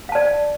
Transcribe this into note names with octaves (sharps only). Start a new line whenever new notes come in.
D5 F5 A5